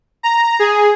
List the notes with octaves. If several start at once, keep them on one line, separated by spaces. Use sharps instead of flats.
A#5
G#4